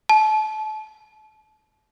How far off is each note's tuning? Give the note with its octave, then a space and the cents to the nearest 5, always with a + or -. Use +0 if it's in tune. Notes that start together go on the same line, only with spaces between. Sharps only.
A5 -30